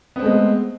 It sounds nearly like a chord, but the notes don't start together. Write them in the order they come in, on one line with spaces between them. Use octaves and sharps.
B3 C4 A3 G#3